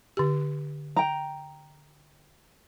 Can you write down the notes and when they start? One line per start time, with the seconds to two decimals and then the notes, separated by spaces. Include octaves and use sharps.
0.17 D3 G4
0.96 G5 A#5